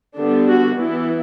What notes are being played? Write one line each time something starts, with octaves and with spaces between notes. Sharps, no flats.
D3 G3 B3 D4
F#4
E3 B3 E4